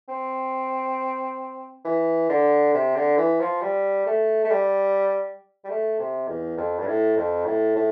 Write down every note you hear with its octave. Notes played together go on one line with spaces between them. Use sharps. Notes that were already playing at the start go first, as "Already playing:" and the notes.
C4
E3
D3
C3
D3
E3
F3
G3
A3
A3
G3
G3
A3
C3
E2
F2
G2
A2
F2
A2
A2